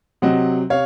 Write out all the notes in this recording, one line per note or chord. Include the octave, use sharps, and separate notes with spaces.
C3 F#3 C4 D#5 F#5
C3 C#5 F5